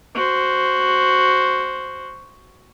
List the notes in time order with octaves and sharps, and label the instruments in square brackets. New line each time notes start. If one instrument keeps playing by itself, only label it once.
[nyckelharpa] F#4 C5